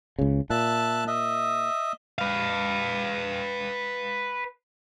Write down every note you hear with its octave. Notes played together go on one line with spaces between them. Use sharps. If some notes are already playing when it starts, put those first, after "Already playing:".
C#2 C#3
A#2 E5 A5 F#6
D#5 E5
B4 F5